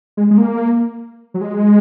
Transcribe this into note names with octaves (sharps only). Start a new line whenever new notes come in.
G#3
G#3
A#3
F#3
G#3